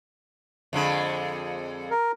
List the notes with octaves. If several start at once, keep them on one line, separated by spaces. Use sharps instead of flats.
F2 D3 G#3
A#4